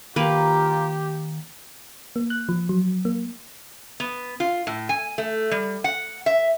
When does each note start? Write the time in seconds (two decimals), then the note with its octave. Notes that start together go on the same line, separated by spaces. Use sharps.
0.16 D#3 A#3 F4 G4 B4 A#5
2.16 A#3
2.30 F#6
2.49 F3
2.69 F#3
3.05 A#3
4.00 B3
4.40 F4
4.67 A2
4.89 G#5
5.18 A3
5.51 G3
5.84 F#5
6.26 E5